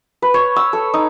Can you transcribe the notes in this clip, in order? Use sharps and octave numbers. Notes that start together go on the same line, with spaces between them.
B4
C#5
E6
A4
D#4